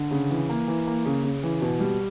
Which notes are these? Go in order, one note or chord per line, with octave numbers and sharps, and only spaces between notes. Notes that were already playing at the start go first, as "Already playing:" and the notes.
Already playing: D3
C#3
E3
A#3
E3
A#3
C#3
C#3
E3
B2
G3